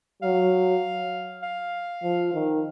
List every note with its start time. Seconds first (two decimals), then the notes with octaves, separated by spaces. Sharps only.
0.22 F#3 F5
1.43 F5
2.03 F3
2.34 D#3